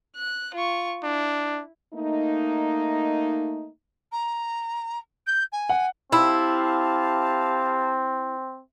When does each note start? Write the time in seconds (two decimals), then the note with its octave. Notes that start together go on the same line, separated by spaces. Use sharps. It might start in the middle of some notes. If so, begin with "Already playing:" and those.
0.16 F#6
0.54 F4 C#6
1.04 D4 E4
1.94 A3 A#3 D#4
4.12 A#5
5.26 G6
5.52 G#5
5.69 F#5
6.12 C4 E4 G4 F5 A5